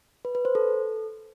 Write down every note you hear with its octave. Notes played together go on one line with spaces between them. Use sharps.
B4
B4
C5
A4